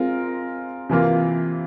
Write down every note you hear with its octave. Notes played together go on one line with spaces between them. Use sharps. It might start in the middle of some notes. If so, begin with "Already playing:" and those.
Already playing: G#3 C4 F4 A#4
C3 E3 A#3 F4